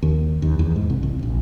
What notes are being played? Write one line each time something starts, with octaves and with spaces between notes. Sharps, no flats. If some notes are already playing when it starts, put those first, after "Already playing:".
D#2
D#2
E2
G#2
C2
C2
A#1